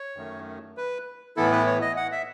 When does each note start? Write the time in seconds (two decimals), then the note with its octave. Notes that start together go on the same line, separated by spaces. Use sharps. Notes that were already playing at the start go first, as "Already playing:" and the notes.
Already playing: C#5
0.16 F#2 D#3 A3
0.77 B4
1.37 A2 E3 B3 E4 A4
1.52 B4
1.67 C#5
1.82 D#5
1.97 F#5
2.12 E5